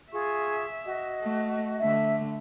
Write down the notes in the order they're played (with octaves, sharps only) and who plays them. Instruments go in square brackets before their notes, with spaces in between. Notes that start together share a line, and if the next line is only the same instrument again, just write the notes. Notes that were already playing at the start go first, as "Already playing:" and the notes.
[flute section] F4 G#4 C#6 [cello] E5
[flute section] F#4 D#5
[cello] A3
[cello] D3 A3 [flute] E5